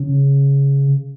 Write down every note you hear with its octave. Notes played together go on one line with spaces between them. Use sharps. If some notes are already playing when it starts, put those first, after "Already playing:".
Already playing: C#3